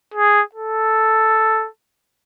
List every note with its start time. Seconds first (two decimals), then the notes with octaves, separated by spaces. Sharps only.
0.14 G#4
0.55 A4